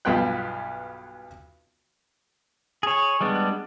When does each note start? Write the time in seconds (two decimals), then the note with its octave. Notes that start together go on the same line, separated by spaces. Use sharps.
0.05 B1 G2 B3 F4 G5 F#6
2.83 G#4 C#5
3.21 G3 G#3 B3 D4